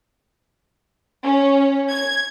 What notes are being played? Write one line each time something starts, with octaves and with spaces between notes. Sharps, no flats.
C#4
G#6